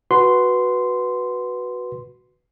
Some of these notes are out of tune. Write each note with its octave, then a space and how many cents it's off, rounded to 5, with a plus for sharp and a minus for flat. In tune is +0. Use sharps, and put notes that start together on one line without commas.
F#4 +0 B4 -5 C6 -10